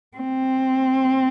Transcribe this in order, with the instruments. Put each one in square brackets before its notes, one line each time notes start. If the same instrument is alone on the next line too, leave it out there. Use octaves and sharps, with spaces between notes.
[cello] C4